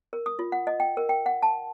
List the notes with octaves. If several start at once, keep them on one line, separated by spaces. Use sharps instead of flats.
A#4
D#6
F4
F#5
D#5
G5
A#4
G5
F#5
A5